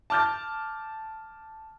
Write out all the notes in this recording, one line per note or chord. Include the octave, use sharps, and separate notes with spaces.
A5 D6 F6 G6 A6